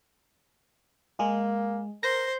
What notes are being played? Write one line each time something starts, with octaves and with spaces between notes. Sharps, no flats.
G#3 A#3 G#4
A#4 C5 A#6